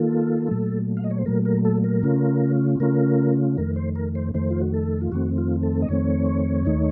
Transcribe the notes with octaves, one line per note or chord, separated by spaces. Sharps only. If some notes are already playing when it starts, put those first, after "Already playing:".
Already playing: D#3 A#3 F4 A4
A#2 F#3 A3
F5
D#5
C#5
C5
A#2 F#3 A3 A#4
A#4
A4
A#4
C#3 A3 C#4 F4
C#3 A3 C#4 F4 A#4
F2 D#3 A3 A#4
C5
A#4
C5
F2 D#3 A3 C5
F4
F#4
A4
F4
F2 D#3 A3 C4 F#4
F4
A4
D#5
F2 D#3 A3 C4 C#5
D#2 D#3 A3 D#4